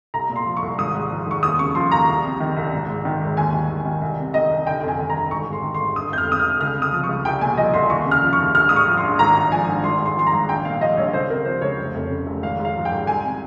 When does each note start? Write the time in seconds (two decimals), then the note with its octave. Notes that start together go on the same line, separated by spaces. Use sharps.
0.14 C2 A#5
0.30 A#2
0.36 C6
0.46 F3
0.57 C#6
0.62 C2
0.78 G#1 D#6
0.94 G#2
1.11 F3
1.27 G#1 C#6
1.43 D#2 D#6
1.59 C#3 C#6
1.75 F3 C6
1.92 D#2 A#5
2.08 C2
2.24 C3
2.40 D#3
2.57 C2
2.72 G#1
2.88 G#2
3.05 D#3
3.21 G#1
3.37 D#2 G#5
3.53 D#3
3.69 D#2
3.85 D#3
4.02 C2
4.18 C3
4.34 D#3 D#5
4.51 C2
4.66 G1 G5
4.83 F2
4.88 G#5
4.99 D#3
5.10 A#5
5.15 G1
5.31 G#1 C#6
5.48 G#2
5.53 C6
5.63 D#3
5.74 C6
5.80 G#1
5.96 G1 D#6
6.12 F2 G6
6.18 F6
6.28 C3 D#6
6.39 F6
6.44 G1
6.61 C#2 F6
6.77 C3
6.82 D#6
6.93 F3
7.04 C#6
7.09 C#2
7.25 C2 G5
7.41 A#2 G#5
7.57 F3 D#5
7.74 C2 C6
7.90 D#2 C#6
8.06 C#3
8.11 F6
8.22 F3
8.33 C#6
8.39 D#2
8.54 A#1 F6
8.69 G#2 D#6
8.76 C#6
8.87 F3
8.97 C6
9.03 A#1
9.19 G#1 A#5
9.36 G2
9.51 F3 G#5
9.68 G#1
9.84 G#1 C6
10.00 G#2
10.05 C6
10.16 F3 C6
10.27 A#5
10.32 G#1
10.49 A#1 G5
10.65 A#2 F5
10.81 F3 D#5
10.97 A#1 C#5
11.13 C#2 C5
11.29 C3 A#4
11.45 F3 C5
11.62 C#2 C#5
11.78 F1
11.94 F2
12.10 C#3
12.26 F1
12.42 G#1 F5
12.59 G#2
12.65 F5
12.76 F3
12.85 G5
12.91 G#1
13.07 C2 G#5
13.24 C3